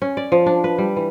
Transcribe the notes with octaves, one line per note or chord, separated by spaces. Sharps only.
C#4
D5
F3
D4
B4
G3
E3